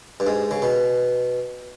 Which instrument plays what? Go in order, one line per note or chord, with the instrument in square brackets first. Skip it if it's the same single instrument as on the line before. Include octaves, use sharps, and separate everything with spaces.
[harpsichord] G2
G#2
C#3
B2